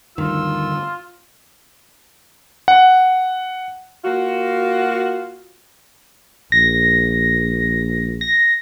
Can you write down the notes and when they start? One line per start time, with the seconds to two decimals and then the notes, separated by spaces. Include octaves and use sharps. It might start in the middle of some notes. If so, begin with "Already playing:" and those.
0.18 D2 G2 D3 D#3 F4 E6
2.68 F#5
4.04 A#3 F4 F#4
6.52 A#1 A#6
8.21 A#6